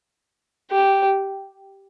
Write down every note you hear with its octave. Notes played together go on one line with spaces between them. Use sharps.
G4